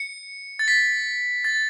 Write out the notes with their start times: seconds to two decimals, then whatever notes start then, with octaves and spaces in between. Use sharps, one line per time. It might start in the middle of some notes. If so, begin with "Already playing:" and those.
Already playing: C#7
0.59 A6
0.68 B6
1.44 A6